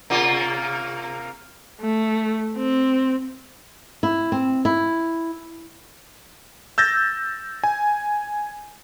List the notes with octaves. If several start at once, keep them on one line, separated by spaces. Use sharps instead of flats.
C3 A#3 F4
A3
C4
E4
C4
E4
E6 G6 A6 A#6
G#5